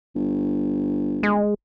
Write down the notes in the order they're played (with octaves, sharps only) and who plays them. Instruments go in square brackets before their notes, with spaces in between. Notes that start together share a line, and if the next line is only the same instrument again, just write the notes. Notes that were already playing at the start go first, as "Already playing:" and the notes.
[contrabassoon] G1
[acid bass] G#3